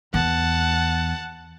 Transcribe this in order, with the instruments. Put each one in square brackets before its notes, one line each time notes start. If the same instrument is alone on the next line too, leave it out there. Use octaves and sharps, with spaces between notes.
[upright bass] E2 [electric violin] F#5 A5